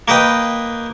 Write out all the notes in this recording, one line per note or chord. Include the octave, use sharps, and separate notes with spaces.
A#3 A#4 B4 D#5 G5